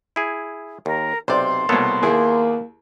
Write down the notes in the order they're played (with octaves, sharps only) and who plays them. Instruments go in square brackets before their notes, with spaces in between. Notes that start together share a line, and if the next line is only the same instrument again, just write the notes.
[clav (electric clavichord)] E4 G#4
[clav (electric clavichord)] D#2 [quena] A#4
[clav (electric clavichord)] B1 C3 [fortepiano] C5 D5 [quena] C6
[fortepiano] C2 B2 A#3 [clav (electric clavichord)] B3 A4 C#5
[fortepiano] D#2 E4 G#4 [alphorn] A#3